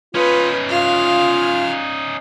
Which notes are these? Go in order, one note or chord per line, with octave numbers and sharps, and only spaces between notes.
C#4 D#4 F4 B4
F4 F5